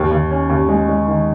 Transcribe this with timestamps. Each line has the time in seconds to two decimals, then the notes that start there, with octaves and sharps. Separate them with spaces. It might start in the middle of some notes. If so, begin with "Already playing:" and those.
Already playing: D#2
0.11 D#2
0.31 C#4
0.50 D#2
0.69 G#3
0.89 G#3
1.07 D#3